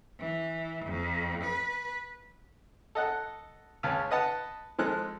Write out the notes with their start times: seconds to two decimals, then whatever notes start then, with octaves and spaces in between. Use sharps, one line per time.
0.19 E3
0.85 F2
1.43 B4
2.95 A4 D#5 F#5 F#6
3.83 C#2 C#3 C#4 A5
4.11 B4 D#5 F#5 A5
4.79 F3 G#3 A4 F#6